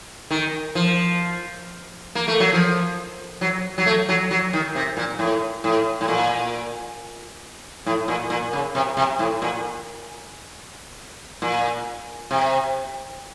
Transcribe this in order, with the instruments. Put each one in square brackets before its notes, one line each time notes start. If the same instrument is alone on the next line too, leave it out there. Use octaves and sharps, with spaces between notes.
[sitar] D#3
F3
A#3
A3
F#3
F3
F#3
F#3
A3
F#3
F#3
D#3
C3
A#2
A2
A2
A2
A#2
A2
A#2
A#2
C#3
C3
C3
A2
A#2
A#2
C3